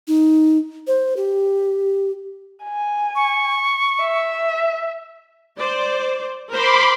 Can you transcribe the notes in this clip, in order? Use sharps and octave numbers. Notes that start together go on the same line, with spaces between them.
D#4
C5
G4
G#5
C#6
E5
C5 D5
A#4 C5 B5 C6 D6